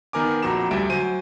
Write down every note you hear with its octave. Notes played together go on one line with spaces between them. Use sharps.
D#3 B3 A#4 G#5 D6
A#1 F2 F#4 A#5 D6 E7
D2 G3 E5 D7
F#3 C5 G#5 D#7